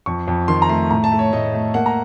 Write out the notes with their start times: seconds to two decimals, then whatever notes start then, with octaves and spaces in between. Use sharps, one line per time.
0.06 F2 C#6
0.28 F2
0.48 D#3 C6
0.62 A#5
0.69 A3 C6
0.91 A2 A#5
1.04 A5
1.12 A3
1.19 C#5
1.32 A2 D#5
1.54 A3
1.74 A#3 F#5
1.86 A#5